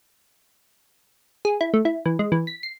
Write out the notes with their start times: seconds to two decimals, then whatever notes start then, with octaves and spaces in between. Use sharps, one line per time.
1.45 G#4
1.61 E4
1.74 A3
1.85 E4
2.06 E3
2.19 G#3
2.32 E3
2.47 B6
2.63 C7